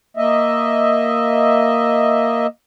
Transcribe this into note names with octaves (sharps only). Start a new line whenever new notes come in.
A#3 D#5 E5